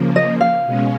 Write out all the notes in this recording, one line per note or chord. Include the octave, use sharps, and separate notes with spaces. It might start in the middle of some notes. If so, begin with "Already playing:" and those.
Already playing: C#3 F3 A#3
D#5
F5
B2 G#3 C#4